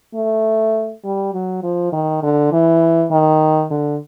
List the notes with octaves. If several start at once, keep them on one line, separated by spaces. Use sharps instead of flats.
A3
G3
F#3
F3
D#3
D3
E3
D#3
D3